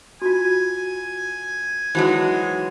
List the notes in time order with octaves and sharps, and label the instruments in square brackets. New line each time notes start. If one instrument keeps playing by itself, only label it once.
[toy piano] F4 F#4 [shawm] G#5
[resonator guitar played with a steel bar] E3 F#3 G#3 [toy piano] D#4 F#4 C5